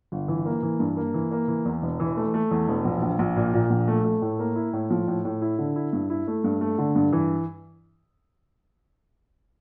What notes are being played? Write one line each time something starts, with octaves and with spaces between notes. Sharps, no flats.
G1
E3
A#3
E3
G2
A#3
E3
A#3
E3
E2
E1
E3
A3
A3
E2
E1
A#1
A#1
A#1
A#2
A#2
A#1
A3
A3
A2
A#3
E4
A2
F3
A2
A2
E4
D3
E4
G2
E4
A3
G2
A3
D3
G2
E3